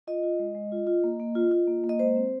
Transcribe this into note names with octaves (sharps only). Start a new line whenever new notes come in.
F4 D#5
F4
G#3
G#3
F4
F4
A#3
A#3
F4
F4
A#3
A#3
D#5
G#3 C5
C4